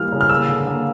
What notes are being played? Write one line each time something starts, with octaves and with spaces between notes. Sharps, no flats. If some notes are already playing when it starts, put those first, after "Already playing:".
Already playing: E3 G3 A#3 F6
C#3
F6
A#3 E6
D3
A#3